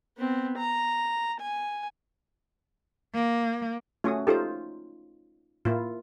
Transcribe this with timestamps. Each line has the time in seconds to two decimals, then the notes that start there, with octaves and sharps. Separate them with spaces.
0.18 B3 C4
0.58 A#5
1.41 G#5
3.14 A#3
4.04 A3 C#4 F4 F#4 D#6
4.27 D#4 F4 G4 A4 C5
5.65 A2 A#3 E4 F4